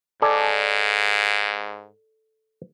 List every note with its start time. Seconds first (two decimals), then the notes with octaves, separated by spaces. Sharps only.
0.22 G#2 A4 D5 G#5